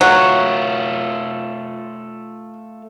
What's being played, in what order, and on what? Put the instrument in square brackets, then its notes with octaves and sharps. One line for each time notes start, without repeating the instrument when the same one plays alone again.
[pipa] F#3 [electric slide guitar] A3 F4